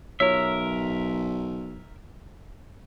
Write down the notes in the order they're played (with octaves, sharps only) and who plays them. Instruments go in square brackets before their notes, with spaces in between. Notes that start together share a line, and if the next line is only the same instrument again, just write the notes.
[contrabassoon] B1 [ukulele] F4 C#5 [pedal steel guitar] A#4 E5